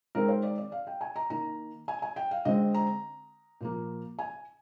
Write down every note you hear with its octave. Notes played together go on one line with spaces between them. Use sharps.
D#3 G#3 C4 A#4
C5
D5
D5
F5
G5
G#5
A#5
D#3 A#3 A#5
G#5
G#5
G5
F5
D3 G#3 C4 D#5
A#5
A#2 F3 A#3
G#5